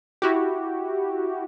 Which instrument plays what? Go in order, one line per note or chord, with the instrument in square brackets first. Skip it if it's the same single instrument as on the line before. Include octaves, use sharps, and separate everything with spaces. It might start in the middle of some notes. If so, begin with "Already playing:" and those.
[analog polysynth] E4 F#4 G4